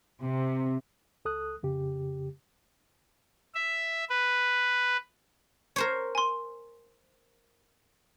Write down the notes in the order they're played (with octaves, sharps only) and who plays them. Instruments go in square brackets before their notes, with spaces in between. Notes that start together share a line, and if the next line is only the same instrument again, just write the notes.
[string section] C3
[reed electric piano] C#2 A4 D#6 F#6
F2 C#3 G4
[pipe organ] E5
B4
[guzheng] A#4 C5 C#5
[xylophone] G#5 C6